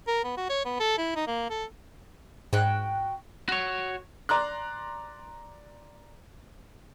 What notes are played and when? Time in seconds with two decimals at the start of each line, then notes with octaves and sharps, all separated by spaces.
0.08 A#4
0.24 B3
0.37 F#4
0.50 C#5
0.65 B3
0.80 A4
0.98 E4
1.16 D#4
1.28 A#3
1.50 A4
2.53 G#2 F#4 G5 F#6
3.48 F#4 C#5
4.29 D5 A#5 C6 F#6